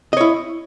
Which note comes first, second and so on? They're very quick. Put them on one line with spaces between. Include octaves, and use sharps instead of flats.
D#5 C#5 E4